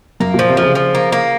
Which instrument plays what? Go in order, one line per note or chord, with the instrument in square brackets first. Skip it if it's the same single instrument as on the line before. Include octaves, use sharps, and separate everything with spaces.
[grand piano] F#2 [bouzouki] A#3
[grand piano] A#2
[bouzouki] F3
[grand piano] C3
[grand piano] C#3 [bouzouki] F3
[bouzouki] F3
A#3
A#3